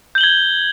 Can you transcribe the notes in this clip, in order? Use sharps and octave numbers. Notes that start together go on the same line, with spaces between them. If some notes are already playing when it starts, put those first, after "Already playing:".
G6 G#6 F#7 G7